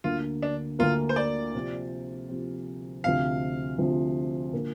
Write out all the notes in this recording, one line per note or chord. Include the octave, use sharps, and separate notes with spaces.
D2 D3 A#3 F4
D4
D2 D3 A#3 F4
C5
D5
C3 F3 C4 G4
C3 F3 C4 G4
D2 C3 F3 F5
D2 C3 F3
D3 A#3 F4 A#4